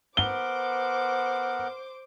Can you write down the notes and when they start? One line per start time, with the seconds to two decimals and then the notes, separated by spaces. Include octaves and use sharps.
0.17 B3 A#4 C5 F#5 D6 G7